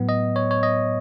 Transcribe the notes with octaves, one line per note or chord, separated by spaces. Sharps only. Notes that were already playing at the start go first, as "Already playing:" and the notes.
Already playing: A2 F#3 B3
D#5
C#5
C#5
D#5